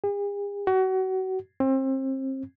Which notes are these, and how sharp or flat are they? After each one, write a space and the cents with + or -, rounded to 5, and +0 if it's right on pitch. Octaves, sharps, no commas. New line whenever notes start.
G#4 -45
F#4 +30
C4 +30